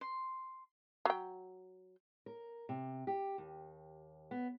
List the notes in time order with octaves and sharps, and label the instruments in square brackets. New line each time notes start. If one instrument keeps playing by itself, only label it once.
[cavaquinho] C6
[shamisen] F#3 G5
[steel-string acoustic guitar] A#4
C3
G4
D#2
B3